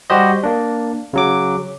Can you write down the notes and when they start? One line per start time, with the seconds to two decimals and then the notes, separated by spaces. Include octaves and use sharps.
0.10 G3 F#4 G4 C5 D#5
0.43 A#3 D4
1.13 C#3 F#3 D6